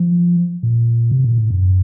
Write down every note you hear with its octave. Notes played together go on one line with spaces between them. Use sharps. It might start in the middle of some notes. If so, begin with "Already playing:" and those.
Already playing: F3
A#2
C3
A#2
A2
F#2